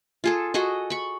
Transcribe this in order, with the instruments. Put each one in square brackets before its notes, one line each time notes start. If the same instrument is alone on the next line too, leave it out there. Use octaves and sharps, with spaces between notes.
[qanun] F4 G#4 A4
F#4 G#4 A4 D#5
B5 C#6